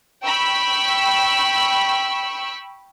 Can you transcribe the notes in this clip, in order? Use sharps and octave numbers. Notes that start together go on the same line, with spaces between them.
G5 B5 C#6 E6